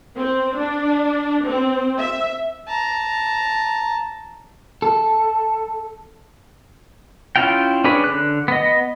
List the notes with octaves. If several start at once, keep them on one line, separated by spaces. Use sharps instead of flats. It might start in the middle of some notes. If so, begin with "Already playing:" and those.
C4
D4
C4
E5
A5 A#5
A4
C#4 E4 F4 F5 G5
C#4 D4 G#4 B4
D3 F#6
B3 D#5